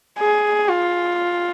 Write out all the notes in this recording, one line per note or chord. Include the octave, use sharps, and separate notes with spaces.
G#4
F4